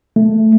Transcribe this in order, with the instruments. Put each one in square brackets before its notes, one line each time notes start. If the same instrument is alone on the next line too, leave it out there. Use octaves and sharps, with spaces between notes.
[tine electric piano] A3